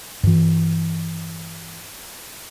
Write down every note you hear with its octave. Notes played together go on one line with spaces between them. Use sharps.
G2 E3